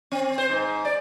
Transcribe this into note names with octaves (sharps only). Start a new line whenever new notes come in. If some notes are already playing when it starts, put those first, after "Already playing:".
C4
C5
G#2
D5